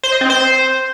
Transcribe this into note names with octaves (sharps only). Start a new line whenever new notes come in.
C5
D#5
C4
C5